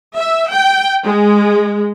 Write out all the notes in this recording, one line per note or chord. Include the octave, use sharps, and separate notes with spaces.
E5
G5
G#3